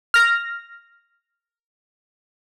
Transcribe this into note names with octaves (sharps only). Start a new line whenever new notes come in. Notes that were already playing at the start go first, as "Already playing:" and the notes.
F6 A#6